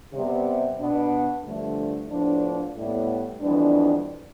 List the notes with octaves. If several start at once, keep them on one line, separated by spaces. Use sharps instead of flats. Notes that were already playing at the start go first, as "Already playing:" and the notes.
C3 G3 B3
B2 B3 D4
G2 D3 F3 A3
A2 F3 B3 D4
A2 G3 B3
F2 E3 G3 B3 D4